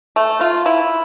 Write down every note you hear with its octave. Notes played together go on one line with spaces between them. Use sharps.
A3
F4
E4